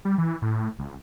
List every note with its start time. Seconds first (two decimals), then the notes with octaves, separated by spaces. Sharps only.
0.05 G3
0.18 E3
0.42 A2
0.79 C#2